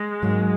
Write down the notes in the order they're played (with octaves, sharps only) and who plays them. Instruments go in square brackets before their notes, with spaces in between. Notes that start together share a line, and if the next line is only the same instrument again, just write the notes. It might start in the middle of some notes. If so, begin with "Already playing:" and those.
Already playing: [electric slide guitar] G#3
[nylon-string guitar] G#2 F#3 A#3